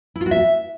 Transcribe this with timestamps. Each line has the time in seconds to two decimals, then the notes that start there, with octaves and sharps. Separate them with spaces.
0.16 E4
0.21 F4
0.26 F#4
0.31 E5